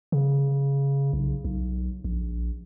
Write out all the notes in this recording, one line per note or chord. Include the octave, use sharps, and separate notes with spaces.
C#3
B1
B1
A#1